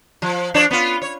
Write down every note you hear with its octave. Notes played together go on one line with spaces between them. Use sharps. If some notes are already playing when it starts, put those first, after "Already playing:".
F3
F3 D4 C#5
B3 F4
C#5